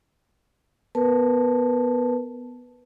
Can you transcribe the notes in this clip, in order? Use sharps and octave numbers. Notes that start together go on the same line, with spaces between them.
B3 A#4 B4 A5